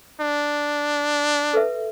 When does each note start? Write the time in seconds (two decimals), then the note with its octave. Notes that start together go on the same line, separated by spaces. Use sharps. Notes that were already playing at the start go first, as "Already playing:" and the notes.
0.21 D4
1.53 A4 B4 E5